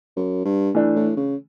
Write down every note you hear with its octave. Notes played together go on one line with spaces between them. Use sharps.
F#2
G2
E3 A3 D4
A2
C#3